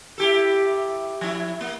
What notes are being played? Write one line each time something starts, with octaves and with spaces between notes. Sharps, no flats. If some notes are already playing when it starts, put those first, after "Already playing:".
E4 G4 A4
F3 E4
A#3